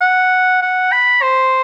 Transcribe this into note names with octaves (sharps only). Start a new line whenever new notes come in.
F#5
F#5
B5
C5